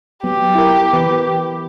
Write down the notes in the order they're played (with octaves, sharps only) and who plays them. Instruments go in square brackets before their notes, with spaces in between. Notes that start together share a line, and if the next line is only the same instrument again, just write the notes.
[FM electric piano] F#3 B3 [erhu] G4
[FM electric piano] E4 A#4
E3 B3 B4